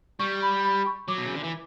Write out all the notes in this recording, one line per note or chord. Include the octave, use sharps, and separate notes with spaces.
G3 C#6
B5
B5
C#6
F#3 D6
B2
C#3
D3
E3